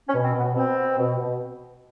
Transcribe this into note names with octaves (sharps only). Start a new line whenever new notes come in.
C#4
B2
C4
B2
B3
B2 C4
B2
B2
B2